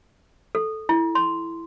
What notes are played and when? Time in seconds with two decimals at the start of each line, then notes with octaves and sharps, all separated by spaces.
0.55 A4
0.89 E4
1.15 C6